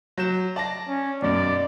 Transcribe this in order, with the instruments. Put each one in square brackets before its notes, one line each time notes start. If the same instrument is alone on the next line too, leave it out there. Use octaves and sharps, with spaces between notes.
[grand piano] F#3 G6 E7
D5 A5 A#6
[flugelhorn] C#4
[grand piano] B1 F#2 [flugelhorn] D5